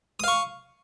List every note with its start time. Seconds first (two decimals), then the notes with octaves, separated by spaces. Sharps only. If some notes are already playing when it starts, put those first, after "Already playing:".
0.20 D#6
0.24 F5
0.28 C#6